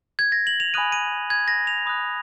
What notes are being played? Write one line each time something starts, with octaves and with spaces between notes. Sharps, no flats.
G#6
A#6
F#7
F7
G#5 B5 D#6 F#6 D#7
D#7
G#6
A#6
F7
B5 D#6 F#6